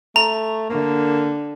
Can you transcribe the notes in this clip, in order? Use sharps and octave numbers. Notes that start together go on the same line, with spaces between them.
A3 A#5
D3 A#3